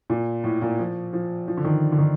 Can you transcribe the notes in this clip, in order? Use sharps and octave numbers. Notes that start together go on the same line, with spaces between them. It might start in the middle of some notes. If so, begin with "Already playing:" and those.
A#2
A2
A#2
F3
F3
F3
D3
D#3
D3
D#3